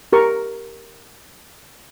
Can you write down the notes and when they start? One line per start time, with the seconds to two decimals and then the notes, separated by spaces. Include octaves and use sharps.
0.13 G4 A#4 C#6